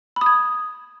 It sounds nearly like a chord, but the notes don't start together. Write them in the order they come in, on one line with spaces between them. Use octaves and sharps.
B5 D#6 G#6